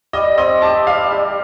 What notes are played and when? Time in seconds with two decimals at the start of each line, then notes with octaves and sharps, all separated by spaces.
0.13 G3 D#5
0.38 C4 D#5
0.62 G4 A5
0.87 G3 F5
1.12 G3